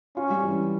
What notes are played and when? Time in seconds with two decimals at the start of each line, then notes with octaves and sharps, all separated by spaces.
0.17 C#4 F4
0.30 G3
0.43 E3